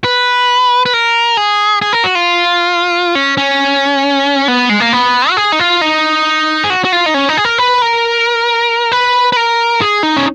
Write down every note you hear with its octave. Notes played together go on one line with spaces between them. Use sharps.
B4
B4
A#4
G#4
G#4
A#4
F#4
F4
C#4
C#4
B3
G#3
A#3
B3
F#4
G#4
D#4
F4
D#4
G#4
F#4
F#4
F4
D#4
C#4
D#4
G#4
A#4
B4
A#4
B4
B4
A#4
G#4
D#4
C#4